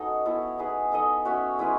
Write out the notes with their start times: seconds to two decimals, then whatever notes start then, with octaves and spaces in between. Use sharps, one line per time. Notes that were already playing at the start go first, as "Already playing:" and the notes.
Already playing: C#4 D#4 F#4 A4 B4 C#5 D#5
0.25 B3 E4 A4 C#5
0.58 D#4 G#4 B4
0.92 D#4 A4 D#5
1.25 C#4 F#4 C#5 E5
1.59 G#3 C#4 E4 B4